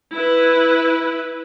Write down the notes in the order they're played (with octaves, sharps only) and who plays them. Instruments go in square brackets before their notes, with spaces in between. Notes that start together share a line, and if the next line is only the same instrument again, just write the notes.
[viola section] E4 B4